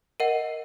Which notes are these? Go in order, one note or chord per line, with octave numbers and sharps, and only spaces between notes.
A#4 D#5 F#5 D#7